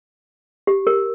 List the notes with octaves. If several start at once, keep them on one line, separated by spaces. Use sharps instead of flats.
G4
A#4